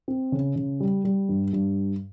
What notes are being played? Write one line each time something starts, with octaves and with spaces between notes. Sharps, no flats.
C4
C#3
C#3
G3
G3
G2
G2